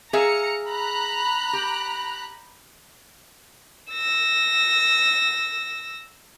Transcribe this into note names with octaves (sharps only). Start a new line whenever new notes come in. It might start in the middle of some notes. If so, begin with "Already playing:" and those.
G#4 E5 F5 A#5 C#7
A#5 B5 F#6
G4
E6 A#6